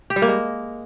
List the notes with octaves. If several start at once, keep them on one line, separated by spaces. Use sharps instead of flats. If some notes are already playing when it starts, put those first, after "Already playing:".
G4
G3
A#3
G#3